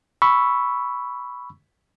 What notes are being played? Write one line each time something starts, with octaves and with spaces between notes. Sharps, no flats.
B5 C#6 E6